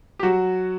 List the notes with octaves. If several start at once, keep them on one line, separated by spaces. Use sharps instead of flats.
G4
F#3 F#4